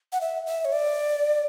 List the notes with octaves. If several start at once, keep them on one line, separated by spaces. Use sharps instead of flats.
F#5
E5
E5
C#5
D5